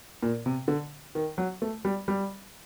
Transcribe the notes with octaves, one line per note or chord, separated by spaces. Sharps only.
A#2
C3
D3
D#3
F#3
A3
G3
G3